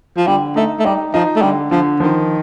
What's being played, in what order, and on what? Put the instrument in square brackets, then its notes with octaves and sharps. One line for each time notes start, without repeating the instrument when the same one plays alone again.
[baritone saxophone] F3
[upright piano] D3 [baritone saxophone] G3
[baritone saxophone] A3 [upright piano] D#4
[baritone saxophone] A3
[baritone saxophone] G3 [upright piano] D#4
[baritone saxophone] F3 [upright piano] D#4
[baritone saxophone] A3
[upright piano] D3 [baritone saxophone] G3
[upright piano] D3 [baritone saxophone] F3
[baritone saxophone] D#3 [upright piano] F3